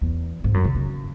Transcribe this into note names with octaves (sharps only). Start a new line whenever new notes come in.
E2
G#2
F#2
C#3
C#3